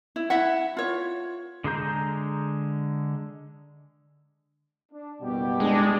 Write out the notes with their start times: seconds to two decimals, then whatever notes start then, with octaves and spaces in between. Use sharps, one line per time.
0.16 E4
0.30 E4 E5 F#5
0.77 F4 C#5
1.64 D3 G#3 G#4 A#5 G6
4.92 D4
5.21 F#1 B2 G3 G4
5.60 G#3 D4